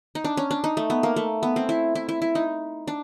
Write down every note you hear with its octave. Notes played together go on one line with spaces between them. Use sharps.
D#4
D4
C#4
D4
D#4
A3
B3
A#3
A3
B3
C4
E4
E4
E4
E4
D#4
D4